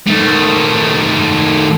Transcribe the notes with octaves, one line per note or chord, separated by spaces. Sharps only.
D#3 A3